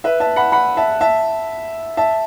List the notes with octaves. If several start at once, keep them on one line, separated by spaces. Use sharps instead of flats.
B4 E5
E5 A5
F#5 B5
F#5 B5
E5 A5
E5 A5
E5 A5